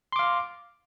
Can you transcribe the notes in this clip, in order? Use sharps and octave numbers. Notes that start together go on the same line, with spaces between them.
F5 C6 D6